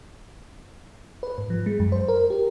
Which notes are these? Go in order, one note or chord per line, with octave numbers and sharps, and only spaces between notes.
B4
G#2
F3
G#3
F#2
C5
A#4
G4